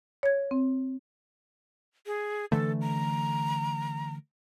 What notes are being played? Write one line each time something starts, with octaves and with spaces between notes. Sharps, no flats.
C#5 G#6
C4
G#4
D3 E3 A3 A4
A#5